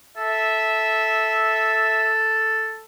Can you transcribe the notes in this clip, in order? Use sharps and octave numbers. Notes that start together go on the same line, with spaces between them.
A4 E5